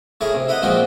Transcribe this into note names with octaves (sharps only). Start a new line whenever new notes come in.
A2 E4 G#4 A#4 C#5 C#6
C3
E4 A#4 B4 D#5 F#5
A#2 F3 G#3 C4 F#4 A#4